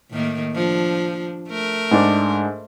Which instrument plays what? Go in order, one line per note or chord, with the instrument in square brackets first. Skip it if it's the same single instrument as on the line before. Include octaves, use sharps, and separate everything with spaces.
[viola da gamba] A2 D#3 A#3
F3 D4
A3 A#4
[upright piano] G#2 D4